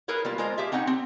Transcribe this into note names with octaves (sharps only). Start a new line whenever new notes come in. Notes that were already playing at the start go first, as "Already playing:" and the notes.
E4 G#4 A#4 B4 C#5
G3 A#3 F4
G#3 F4 A#4 C5
G4 G#4 E5 F5
C4 C#4 D#4 F#5 G5
C4